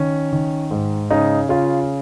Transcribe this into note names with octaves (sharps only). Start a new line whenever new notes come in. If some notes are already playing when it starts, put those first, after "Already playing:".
Already playing: D#3 C#4
D#3
G#2
C#3 D#4
C#3 F4